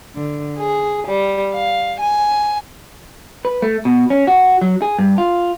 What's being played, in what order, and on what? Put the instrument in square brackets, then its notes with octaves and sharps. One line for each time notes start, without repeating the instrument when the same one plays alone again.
[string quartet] D3
G#4
G3
F5
G#5
[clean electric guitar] B4
A3
B2
C#4
F#4
F#3
G#4
G2
F4